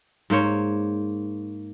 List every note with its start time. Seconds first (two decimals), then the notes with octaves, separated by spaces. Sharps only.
0.30 G#2 A#3 C5 C#5